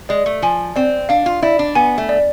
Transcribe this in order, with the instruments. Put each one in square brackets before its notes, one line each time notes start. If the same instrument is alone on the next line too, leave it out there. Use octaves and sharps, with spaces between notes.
[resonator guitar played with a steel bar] G#3 [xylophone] D5
[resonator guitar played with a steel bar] A3
[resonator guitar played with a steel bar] F3 [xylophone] G#5
[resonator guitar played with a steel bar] C4 [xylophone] D5
[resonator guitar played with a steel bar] D4 [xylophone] F5
[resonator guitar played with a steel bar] F4
[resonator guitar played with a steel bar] E4 [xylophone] D5
[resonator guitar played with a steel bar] D4
[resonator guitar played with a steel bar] B3 [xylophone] G#5
[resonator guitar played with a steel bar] A3
[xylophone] D5